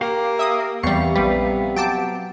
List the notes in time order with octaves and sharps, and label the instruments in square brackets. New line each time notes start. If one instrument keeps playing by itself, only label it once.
[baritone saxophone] A#3 [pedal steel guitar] G4 F5
[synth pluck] E5 D#6
[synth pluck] E2 G3 [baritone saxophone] C3 [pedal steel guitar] B3 F5 [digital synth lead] C#6
[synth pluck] A#1 G3 [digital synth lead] B4
[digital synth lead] F#3 [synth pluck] G5 A5 D6